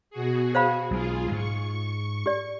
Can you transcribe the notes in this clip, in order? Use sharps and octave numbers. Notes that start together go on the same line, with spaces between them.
B2 F#4 G#4
C5 F5 B5
B1 G#3 F4 G#4
G#2 G#3 C#6
G4 D5